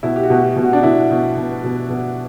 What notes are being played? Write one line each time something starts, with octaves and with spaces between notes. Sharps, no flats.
B2 E4
G4
F#4
B2
F#4
B2
F#4
D4
B2 E4
B2
B2
B2
B2